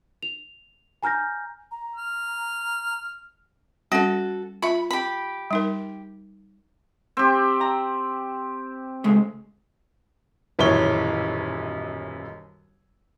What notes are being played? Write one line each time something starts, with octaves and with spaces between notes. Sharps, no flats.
F7
G#5 A#5 F6 G6 A#6
A#5
F6
G3 C#4 F#4 A4
F4 E5 B5
G4 B5
G3 D#4 A#4
C4 G4
A#5
C#3 G#3 A3
D#1 B1 F#2 E3 C#5 G7